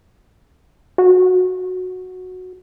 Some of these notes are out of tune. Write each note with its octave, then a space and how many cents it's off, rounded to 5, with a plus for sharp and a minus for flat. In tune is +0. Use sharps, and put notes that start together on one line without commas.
F#4 -10